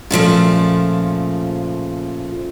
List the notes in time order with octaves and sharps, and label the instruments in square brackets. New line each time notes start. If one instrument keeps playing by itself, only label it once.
[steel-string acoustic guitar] A#2 C#3 F3 A3